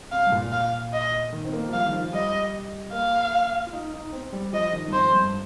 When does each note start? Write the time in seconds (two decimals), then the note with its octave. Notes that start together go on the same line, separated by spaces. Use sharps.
0.12 C3 F5
0.27 G2
0.32 A#2
0.52 F5
0.93 D#5
1.32 D#3
1.45 C4
1.53 A#3
1.69 F3
1.72 G3 F5
1.86 D#3
1.92 F3
2.13 G3 D#5
2.93 A#3 F5
3.67 F4
3.73 D#4
3.93 D#4
4.13 C4
4.32 G3
4.53 F3 D#5
4.73 D#3
4.88 G2
4.93 F2 C5
5.13 G2